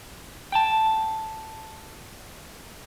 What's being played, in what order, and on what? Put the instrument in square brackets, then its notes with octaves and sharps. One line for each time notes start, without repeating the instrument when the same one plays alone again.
[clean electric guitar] G5 A5